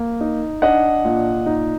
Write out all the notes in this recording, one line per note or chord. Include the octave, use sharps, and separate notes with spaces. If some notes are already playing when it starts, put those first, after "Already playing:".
Already playing: A#3
D#4
D4 D#5 F#5
A#2
D#4